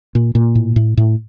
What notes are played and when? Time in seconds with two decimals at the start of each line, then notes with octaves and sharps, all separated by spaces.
0.15 A#2
0.35 A#2
0.55 A2
0.76 A2
0.97 A2